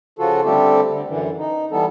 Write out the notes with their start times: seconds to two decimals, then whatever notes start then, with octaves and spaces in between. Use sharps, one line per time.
0.19 C#3 F3 F4 F#4 A4
0.45 D3 G3 A3 C4 G4 A4
0.91 D3
1.07 F#2 D3 E3
1.38 D#4
1.71 E3 G3 B3 A4